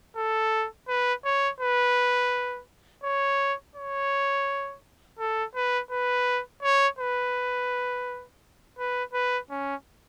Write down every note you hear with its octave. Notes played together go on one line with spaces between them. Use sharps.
A4
B4
C#5
B4
C#5
C#5
A4
B4
B4
C#5
B4
B4
B4
C#4